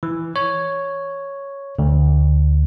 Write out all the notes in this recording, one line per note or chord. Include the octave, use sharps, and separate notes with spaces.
E3
C#5
D2